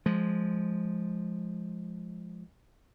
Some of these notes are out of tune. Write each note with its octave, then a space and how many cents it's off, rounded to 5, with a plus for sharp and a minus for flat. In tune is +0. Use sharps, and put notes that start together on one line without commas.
F3 +0 G#3 +0